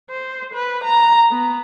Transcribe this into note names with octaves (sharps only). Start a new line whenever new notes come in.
C5
B4
A#5
B3